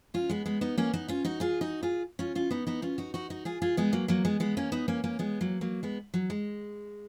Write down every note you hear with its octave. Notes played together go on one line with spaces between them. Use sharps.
C#4 F4
G#3 B3
G#3 B3
B3 D#4
A#3 C#4
B3 D#4
C#4 F4
D#4 F#4
F4 G#4
D#4 F#4
F4 G#4
C#4 F4
C#4 F4
B3 D#4
B3 D#4
C#4 F4
D#4 F#4
D#4 F#4
D#4 F#4
F4 G#4
F4 G#4
G#3 B3
F#3 A#3
F#3 A#3
G#3 B3
G#3 B3
A#3 C#4
B3 D#4
A#3 C#4
A#3 C#4
G#3 B3
F#3 A#3
F#3 A#3
G#3 B3
F#3
G#3